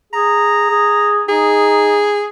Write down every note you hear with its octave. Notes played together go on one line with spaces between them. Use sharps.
G#4 A#5
G#4
D#4 G#4